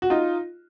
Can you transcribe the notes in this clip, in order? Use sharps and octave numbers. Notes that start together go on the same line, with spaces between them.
F#4
D#4 F4